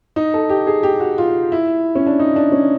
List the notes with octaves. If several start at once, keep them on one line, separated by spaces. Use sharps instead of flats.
D#4
A4
G4
G#4
G4
F#4
F4
E4
C#4
D4
D#4
D4
C#4